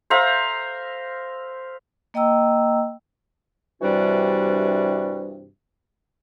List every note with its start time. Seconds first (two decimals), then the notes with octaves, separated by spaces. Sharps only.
0.10 C5 E5 F5 A#5
2.14 A#3 D#5 G5 A#5 E6
3.82 G2 C3 E3 G3 D4 F#4